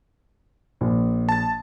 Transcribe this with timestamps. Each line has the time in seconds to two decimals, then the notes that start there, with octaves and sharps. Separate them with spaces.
0.81 A#1
1.29 A5 A6